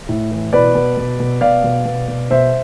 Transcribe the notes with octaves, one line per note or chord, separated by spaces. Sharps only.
A2
E3
B2 B4 D5
B2
B2
B2
B2 D5 F5
B2
B2
B2
B2 C5 E5